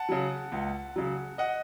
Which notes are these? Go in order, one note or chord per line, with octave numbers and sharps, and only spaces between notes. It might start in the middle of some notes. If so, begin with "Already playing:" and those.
Already playing: F#5 A5
C#3 F#3
C#2
C#3 F#3
D#5 F#5